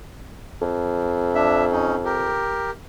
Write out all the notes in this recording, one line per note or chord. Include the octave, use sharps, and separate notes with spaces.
F2
D4 E5
C#4 D#4
G4 A#4